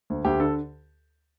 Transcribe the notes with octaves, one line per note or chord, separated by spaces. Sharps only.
D2
D2 G4
D3 A4